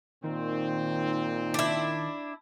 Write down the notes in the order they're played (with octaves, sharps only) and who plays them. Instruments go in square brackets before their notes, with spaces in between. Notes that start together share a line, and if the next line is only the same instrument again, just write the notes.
[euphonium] A#2 [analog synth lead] D#3 [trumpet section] C4
[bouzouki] D4 E4